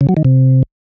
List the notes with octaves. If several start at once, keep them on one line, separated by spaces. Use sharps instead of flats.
C#3
F#3
D#3
C3